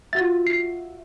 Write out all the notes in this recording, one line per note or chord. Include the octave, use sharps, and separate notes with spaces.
F4 F#4 E5 A6
C7